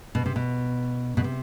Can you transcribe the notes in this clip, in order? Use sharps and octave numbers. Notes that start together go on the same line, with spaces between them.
B2
C3
B2
B2
C3